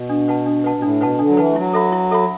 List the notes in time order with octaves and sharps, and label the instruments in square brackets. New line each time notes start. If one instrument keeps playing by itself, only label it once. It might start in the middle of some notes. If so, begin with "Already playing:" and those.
Already playing: [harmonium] B2
[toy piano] D4
B4 F#5 A5
D4
B4 F#5 A5
[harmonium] B2
[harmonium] A2 [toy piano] D4
[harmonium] B2 [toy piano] B4 F#5 A5
[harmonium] D3 [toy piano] D4
[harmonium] F#3
[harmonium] E3 [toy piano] B4 F#5 A5
[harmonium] A3
[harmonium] F#3 [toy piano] E4
[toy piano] A4 E5 B5
E4
A4 E5 B5